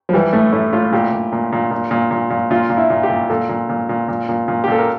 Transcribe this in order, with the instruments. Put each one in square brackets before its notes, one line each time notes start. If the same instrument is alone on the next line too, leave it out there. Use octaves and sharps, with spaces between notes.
[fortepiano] F3
E3 G3
A2 A3
A2 A3
A2 F4
A#2 G4
A#2
A#2
A#2
A#2
A#2
A#2
A#2
A#2 F4
A#2
E4
A#2
G4
A#2
A#2 A4
A#2
A#2
A#2
A#2
A#2
A#2
G4
A#2 A4
A#4